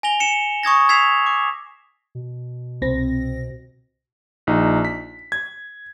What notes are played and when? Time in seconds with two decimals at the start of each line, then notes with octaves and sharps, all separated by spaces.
0.03 G#5 A#6 F7 G7
0.20 C#7 E7
0.63 C#6 D#6 G#6 A#6
0.89 E6 G#6 B6 C7 E7 F7
1.26 D6
2.15 B2
2.82 C2 C4 A#6
4.47 A#1 D#4
4.85 B6
5.32 G#6